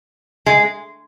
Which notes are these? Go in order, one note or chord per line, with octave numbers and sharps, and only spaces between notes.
G#3